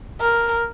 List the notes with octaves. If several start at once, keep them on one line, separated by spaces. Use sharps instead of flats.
A#4